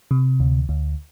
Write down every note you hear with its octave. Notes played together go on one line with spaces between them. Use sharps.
C3
D2
D2